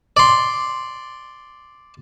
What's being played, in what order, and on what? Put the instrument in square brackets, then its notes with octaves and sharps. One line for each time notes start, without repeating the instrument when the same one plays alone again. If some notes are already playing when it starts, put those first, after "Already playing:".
[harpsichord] D5 C6